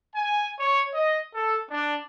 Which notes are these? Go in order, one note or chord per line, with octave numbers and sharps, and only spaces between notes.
G#5
C#5
D#5
A4
D4